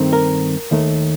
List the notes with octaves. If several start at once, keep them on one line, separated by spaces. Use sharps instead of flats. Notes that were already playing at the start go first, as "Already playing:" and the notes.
Already playing: G2 D#3 A3 C4
A#4
D#2 D#3 A3